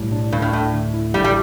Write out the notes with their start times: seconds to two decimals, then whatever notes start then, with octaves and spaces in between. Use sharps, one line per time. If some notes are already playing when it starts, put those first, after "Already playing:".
Already playing: B1 A2 G3
0.12 D4
0.32 D2 G2
0.42 A2
0.53 A2 A3
0.73 D3
0.94 E4
1.14 A1 G3
1.24 G3